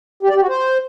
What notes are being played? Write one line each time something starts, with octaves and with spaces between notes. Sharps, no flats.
G4
D5
G4
F#4
C5